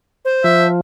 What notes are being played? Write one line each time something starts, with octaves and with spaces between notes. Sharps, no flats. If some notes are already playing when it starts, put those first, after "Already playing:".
C5
F3 E5